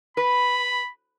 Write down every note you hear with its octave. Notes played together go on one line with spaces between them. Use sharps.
B4 B5